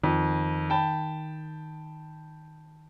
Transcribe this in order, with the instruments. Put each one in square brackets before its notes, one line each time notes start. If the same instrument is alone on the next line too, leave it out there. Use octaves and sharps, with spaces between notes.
[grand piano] F2 [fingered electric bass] D#3
[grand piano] G5 A5 B5